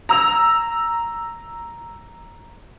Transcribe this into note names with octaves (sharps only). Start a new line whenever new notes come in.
A#5 E6 F7